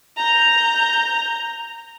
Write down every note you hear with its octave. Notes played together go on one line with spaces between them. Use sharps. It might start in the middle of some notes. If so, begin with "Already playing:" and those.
A#5 G6